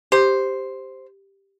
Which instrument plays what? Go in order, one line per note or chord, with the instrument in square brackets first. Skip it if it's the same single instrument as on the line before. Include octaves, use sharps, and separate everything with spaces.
[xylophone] G4 [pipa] C5